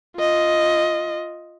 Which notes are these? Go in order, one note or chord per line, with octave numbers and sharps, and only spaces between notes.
F4 D#5